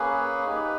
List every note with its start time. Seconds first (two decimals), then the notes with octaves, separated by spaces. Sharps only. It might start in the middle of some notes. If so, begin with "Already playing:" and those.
Already playing: A#3 C#4 G#4 B4
0.45 D#4 G4 B4